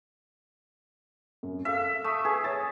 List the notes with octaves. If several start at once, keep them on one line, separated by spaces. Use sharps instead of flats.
F#2
A4 E5 F5 F6
A3 D#6 E6
G#4 B4
C#5 A6